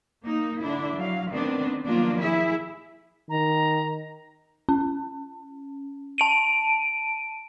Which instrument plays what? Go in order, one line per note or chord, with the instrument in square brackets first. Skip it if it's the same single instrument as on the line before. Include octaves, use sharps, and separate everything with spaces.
[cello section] A#3 D#4
D3 D4 E4
F#3 F5
D#3 A3 B3 C4 D4
D#3 F3 F#3 A#3 D4 F4
E4 G#4 E5
[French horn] D#3 [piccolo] A#5
[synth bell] C#4
A5 D7 D#7